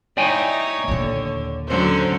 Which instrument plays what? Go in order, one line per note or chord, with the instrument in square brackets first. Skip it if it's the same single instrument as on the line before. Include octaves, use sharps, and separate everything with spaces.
[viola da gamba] D#4 E4 [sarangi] C#5 [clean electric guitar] D5 G5 G#5
[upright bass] D#2 A#2 [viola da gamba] D3
[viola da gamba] D3 F#3 C#4 [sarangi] C5